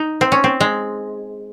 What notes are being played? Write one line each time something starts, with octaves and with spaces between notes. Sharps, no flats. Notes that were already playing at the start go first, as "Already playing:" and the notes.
Already playing: D#4
C4
C#4
C4
G#3